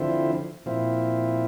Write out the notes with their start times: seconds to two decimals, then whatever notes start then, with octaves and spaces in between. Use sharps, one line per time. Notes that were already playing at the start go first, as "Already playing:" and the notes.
Already playing: D3 F3 C4 E4
0.66 A#2 F3 C4 E4